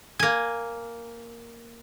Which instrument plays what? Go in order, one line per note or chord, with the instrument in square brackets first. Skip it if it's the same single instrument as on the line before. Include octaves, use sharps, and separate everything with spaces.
[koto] A#3 G#5